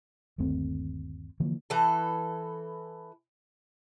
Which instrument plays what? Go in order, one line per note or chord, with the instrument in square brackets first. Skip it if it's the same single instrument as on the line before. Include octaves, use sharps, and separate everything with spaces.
[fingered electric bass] G1 D#2 A3 C4
D3 E3 F3 A#3
[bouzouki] E3 A4